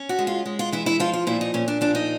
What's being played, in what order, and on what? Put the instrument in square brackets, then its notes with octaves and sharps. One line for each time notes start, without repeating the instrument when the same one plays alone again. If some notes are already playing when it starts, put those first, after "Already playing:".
Already playing: [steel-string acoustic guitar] C#4
F#4
G#3
F4
G#3
F4
E3 E4
E4
F3 F4
F4
A#2 E4
D#4
A#2 C#4
D4
F3 D4
D#4